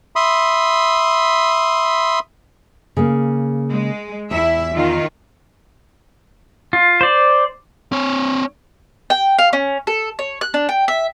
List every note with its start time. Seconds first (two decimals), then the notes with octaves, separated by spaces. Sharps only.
0.16 E5 B5 C6 D#6
2.97 C#3 A#3
3.71 G#3
4.31 E2 E4 E5
4.74 D#3 F4
6.73 F4
7.01 C5 D5
7.92 C4 C#5
9.10 G5
9.38 F5
9.53 C#4
9.87 A4
10.19 C#5
10.41 F#6
10.54 D4
10.69 G5
10.88 E5